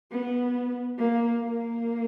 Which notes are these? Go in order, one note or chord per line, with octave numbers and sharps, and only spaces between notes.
B3
A#3
A#3